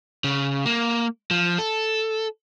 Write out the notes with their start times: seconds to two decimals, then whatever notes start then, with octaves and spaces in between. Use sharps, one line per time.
0.24 C#3
0.66 A#3
1.31 F3
1.58 A4